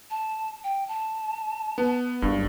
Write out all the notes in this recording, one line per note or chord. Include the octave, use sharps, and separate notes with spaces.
A5
G5
A5
B3
F#1 G2